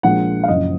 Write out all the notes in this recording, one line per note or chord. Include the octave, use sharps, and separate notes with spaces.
A#1 A#2 F3 G#3 F#5
F5
F#1 F#2 F3 D#5